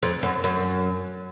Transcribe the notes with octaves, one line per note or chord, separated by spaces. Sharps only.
F2
F#2
F#2